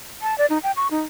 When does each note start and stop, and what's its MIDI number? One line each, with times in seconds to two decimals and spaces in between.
0.22 0.37 81
0.38 0.46 74
0.50 0.58 63
0.63 0.72 79
0.77 0.88 85
0.91 1.01 63